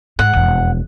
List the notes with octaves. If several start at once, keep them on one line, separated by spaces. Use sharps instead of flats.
G#2 F#5
E1 F2